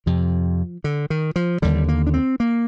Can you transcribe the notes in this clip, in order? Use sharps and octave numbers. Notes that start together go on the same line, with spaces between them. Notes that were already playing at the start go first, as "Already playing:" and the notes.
F2 C3 F3
D3
D#3
F3
D#2 D3 G3
A#3
D4
C4
A#3